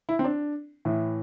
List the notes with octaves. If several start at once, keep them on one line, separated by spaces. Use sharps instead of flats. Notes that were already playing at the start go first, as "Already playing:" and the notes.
E4
C4
D4
A2 E3